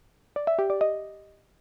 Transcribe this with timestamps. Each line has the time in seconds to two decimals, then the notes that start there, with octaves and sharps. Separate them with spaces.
0.36 D5
0.47 E5
0.59 G4
0.70 D5
0.81 D#5